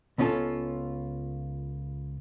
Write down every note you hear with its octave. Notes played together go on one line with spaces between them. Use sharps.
C#2 B3 C#4 F4 A4